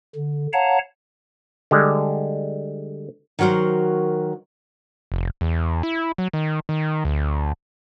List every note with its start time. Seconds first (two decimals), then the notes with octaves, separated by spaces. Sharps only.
0.15 D3
0.53 C#5 F5 F#5 A5 A#5
1.71 D3 G3 G#3
3.39 D#3 F#3 F#4 A#4 C5
5.12 F1
5.41 E2
5.83 E4
6.18 F#3
6.33 D#3
6.69 D#3
7.05 D2